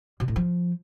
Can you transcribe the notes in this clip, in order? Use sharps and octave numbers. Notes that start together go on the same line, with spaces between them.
B2
A2
F3